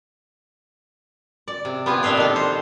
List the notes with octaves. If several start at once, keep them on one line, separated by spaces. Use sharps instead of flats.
D5
C3
B3 F4 G4 G#5
A#2 D4 E5 F5 G5
D#3 A4
C5